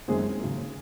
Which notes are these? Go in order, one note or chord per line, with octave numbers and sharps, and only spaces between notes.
F#2 D#3 G#3 C4 G#4
D#2 C#3 F#3 A#3